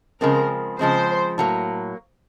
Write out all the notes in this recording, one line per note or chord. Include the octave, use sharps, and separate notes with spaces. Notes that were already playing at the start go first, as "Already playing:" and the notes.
C#3 F3 G#3 C4 A#4
C#3 F3 G#3 C4 C5
A2 F#3 A#3